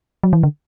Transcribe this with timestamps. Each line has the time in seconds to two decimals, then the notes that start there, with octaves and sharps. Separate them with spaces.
0.23 F#3
0.33 E3
0.43 D3